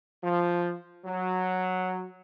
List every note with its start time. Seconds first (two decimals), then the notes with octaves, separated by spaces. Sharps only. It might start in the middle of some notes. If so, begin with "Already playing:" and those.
0.24 F3
1.05 F#3